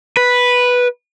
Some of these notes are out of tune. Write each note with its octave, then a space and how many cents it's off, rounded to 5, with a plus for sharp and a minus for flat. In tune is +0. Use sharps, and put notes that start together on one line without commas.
B4 -5